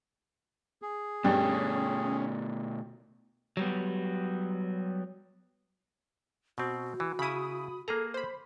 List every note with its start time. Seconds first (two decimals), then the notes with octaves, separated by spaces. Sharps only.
0.82 G#4
1.24 G2 B2 A3 C#4
3.57 F#3 G3 B3
6.58 B2 C4 F#4
7.00 E3
7.19 C#3 E4 B5 D#6
7.88 A#3 G#4 A4 A#5
8.14 C5 B5